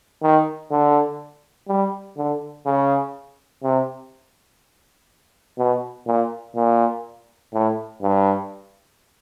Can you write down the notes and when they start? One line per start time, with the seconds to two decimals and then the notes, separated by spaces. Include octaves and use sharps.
0.22 D#3
0.71 D3
1.68 G3
2.17 D3
2.66 C#3
3.63 C3
5.58 B2
6.07 A#2
6.56 A#2
7.53 A2
8.02 G2